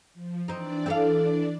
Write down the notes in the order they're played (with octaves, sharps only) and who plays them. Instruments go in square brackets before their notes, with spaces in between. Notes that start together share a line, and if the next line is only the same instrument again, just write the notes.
[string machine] F3
[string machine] E3 D4 D5 [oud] C4 D#4
[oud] C4 A4 F5